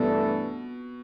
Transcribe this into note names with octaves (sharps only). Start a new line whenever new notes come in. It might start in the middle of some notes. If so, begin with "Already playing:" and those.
Already playing: G2 B2 E3 A3 D4 A4